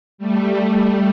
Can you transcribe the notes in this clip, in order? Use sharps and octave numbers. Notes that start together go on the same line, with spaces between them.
G3 A3
G3 A3